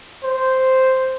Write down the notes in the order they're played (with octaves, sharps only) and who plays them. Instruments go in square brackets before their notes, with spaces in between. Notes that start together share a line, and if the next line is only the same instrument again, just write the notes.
[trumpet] C5